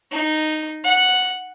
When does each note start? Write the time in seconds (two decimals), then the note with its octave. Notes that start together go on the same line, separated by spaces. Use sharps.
0.11 D#4
0.83 F#5